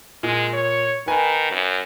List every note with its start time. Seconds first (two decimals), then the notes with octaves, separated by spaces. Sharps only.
0.23 A#2 G#3
0.53 C#5
1.08 D#3 B4 G#5 A#5
1.51 F#2